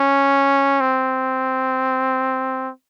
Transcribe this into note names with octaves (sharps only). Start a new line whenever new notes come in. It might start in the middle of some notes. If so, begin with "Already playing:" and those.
Already playing: C#4
C4